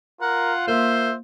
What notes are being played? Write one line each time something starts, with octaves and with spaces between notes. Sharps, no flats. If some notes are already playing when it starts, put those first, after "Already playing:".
F4 A#4 F#5
A#3 C5 E5